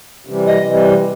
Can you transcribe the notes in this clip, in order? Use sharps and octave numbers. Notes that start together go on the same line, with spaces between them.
C3 E3 G3
D#5
C3 E3 G3